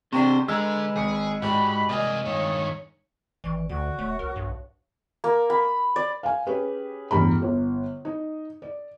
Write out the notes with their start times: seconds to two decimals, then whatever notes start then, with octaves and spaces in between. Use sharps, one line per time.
0.13 C3 D4 G4 C5 G5 C#6
0.48 D3 G#3 B4 A#5 E6
0.96 G#1 G#4 C#7
1.42 G#2 F#4 G4 D5 B5
1.89 C2 A#3 D5 D#5 G#5
2.25 G2 D#3 C#5
3.44 G#1 E3 D5 C#6
3.69 D2 D3 F#4 D5
3.99 D#1 A3 C#5
4.19 C2 A#4
4.36 B1 G2
5.24 A#3
5.50 B5
5.96 D5
6.23 F5 G#5
6.47 C#4 G4 G#4 B4
7.11 A1 E2 G2 A#5 B5
7.42 G1
8.05 D#4
8.62 D5